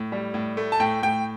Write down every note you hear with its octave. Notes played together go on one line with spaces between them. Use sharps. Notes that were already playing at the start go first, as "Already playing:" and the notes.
Already playing: A2
G3
A2
A3
A5
A2 G5
A2 G5